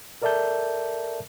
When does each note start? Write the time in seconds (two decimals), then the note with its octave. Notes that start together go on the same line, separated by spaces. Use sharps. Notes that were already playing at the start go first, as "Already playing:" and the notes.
0.22 A4 A#4 D5 E5 A5 G6